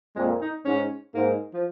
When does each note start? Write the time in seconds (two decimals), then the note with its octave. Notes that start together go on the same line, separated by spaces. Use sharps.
0.16 F2 A#2 G#3
0.41 D#4
0.65 G#2 C#4
1.14 G#2 A#3
1.54 F3